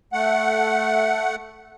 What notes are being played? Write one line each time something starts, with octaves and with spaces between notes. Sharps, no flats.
A3 F#5